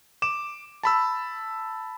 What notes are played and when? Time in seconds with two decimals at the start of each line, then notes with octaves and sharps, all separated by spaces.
0.22 D6 E7
0.83 A5 B5 E6